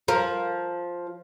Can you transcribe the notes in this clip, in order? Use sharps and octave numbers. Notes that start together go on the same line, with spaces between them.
F3 A#4